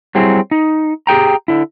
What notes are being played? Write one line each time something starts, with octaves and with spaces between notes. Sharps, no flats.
F#3 G3 C4 E4 G#4
D#4
G4 G#4 G5 A#5
D3 E4